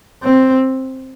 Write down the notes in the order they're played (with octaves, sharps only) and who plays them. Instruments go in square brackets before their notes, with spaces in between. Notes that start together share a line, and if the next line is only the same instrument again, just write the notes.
[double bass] C4